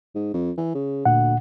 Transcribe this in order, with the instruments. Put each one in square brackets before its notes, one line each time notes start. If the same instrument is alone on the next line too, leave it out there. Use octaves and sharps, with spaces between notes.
[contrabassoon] G#2
F2
E3
C#3
[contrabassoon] D2 [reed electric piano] A#2 F#5